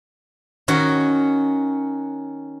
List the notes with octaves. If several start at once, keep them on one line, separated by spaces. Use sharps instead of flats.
D#3 C#4 F#4